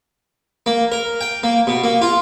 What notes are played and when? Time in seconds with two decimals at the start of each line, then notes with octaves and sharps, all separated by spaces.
0.66 A#3
0.92 A#4
1.21 G5
1.43 A#3
1.67 B2
1.84 A#3
2.02 F4